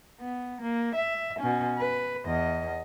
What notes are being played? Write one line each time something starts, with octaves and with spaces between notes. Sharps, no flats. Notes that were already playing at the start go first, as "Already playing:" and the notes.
B3
A#3
E5
B2 C#4
B4
E2 D#5